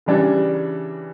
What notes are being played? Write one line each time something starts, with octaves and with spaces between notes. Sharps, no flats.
C#3 E3 G3 D4